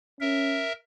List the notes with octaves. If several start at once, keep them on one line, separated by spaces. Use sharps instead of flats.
C#4 A#4 E5